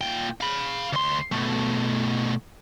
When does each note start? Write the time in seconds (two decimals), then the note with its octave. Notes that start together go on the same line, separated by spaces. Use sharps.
0.01 A#2 G5
0.41 F5 B5
0.93 D2 C6
1.32 B2 A3